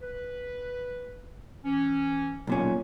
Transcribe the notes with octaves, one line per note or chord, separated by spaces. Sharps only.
B4
E3 C#4
B1 A#2 C#4